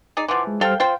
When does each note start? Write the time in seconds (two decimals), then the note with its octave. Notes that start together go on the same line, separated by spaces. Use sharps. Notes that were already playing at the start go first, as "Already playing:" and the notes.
0.17 D#4 G#4 D5
0.28 E3 F3 F#5 C6 D6
0.47 G#3
0.61 G3 A4 C5 F5 G5 F6
0.80 F4 C5 F5 G5